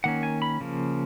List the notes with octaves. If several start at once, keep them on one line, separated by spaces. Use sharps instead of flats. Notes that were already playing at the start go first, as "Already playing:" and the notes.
D#3 A#3 C#4 F#5
G#5
B5
C#3 F3 A#3